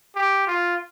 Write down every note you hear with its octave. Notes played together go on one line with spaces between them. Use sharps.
G4
F4